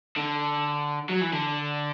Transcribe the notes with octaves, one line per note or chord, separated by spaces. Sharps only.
D3
F#3
E3
D3